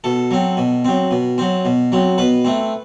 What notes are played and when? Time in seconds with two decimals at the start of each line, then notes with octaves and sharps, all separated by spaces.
0.04 B2 A4
0.31 F#3 C4
0.57 B2
0.85 F#3 C4
1.11 B2
1.38 F#3 C4
1.65 B2
1.92 F#3 C4
2.18 B2 B4
2.45 A3 C4